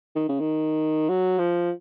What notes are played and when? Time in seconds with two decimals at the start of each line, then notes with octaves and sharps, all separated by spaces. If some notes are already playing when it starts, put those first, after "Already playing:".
0.16 D#3
0.29 C#3
0.40 D#3
1.09 F#3
1.39 F3